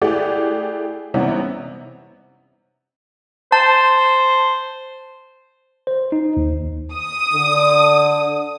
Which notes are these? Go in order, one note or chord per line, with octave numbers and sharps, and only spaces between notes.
A3 E4 G4 G#4 D5 F#5
C3 E3 G3 B3 C#4 D#4
C5 A5
C5
D#4
D#2
D#6
D3